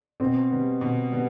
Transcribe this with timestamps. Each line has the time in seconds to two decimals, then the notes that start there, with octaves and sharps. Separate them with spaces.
0.20 B2 C4
0.51 G3 B3
0.81 B2
1.11 G3 B3